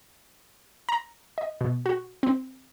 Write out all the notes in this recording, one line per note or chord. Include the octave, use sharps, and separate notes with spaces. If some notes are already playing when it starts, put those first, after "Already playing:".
A#5
D#5
B2
F#4
C4